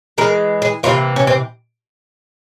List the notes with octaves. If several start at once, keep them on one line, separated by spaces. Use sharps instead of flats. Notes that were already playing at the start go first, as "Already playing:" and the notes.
E3 G#3 A#4
G#4
C3 E3 A#3 F4
C#4
C4